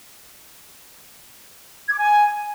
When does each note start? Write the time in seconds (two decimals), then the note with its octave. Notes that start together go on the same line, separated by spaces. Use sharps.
1.87 G#6
1.93 D6
1.99 G#5